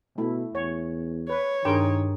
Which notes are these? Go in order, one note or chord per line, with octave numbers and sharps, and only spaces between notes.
B2 A3 E4
E2 C#5
B4 C#5
G2 D#3 D4 G#4 A#4 G5 C6